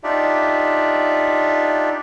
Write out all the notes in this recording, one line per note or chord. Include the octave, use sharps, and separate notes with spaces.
D4 D#4 F4 G4 D5 E5